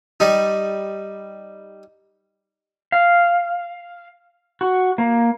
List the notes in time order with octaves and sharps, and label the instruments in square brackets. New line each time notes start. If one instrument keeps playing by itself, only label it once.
[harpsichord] G3 D#4
[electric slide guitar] F5
F#4
A#3